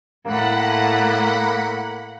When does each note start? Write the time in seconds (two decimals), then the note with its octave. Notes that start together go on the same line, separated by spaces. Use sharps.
0.26 A2 A#3 F#5 B5